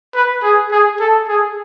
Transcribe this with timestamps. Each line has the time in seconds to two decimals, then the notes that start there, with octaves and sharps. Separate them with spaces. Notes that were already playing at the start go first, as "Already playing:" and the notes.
0.14 B4
0.43 G#4
0.72 G#4
1.00 A4
1.28 G#4